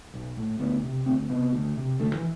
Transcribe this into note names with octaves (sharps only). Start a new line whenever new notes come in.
B1
A2
D2 B3
C3
D2 C4
C3 B3
D2
C3
D2 A3
E3